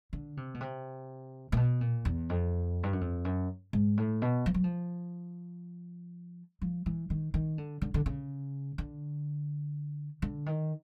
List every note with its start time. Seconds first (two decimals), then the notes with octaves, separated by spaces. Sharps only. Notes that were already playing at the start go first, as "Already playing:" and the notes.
0.13 D3
0.37 C3
0.54 B2
0.61 C3
1.52 A#2
1.57 B2
1.81 A#2
2.05 E2
2.29 F2
2.83 G2
2.93 F#2
3.01 F2
3.25 F#2
3.73 G#2
3.97 A2
4.22 B2
4.46 F3
4.54 F#3
4.64 F3
6.62 F3
6.86 E3
7.10 D#3
7.34 D#3
7.58 D3
7.82 D3
7.94 D3
8.06 C#3
8.78 D3
10.22 D3
10.46 D#3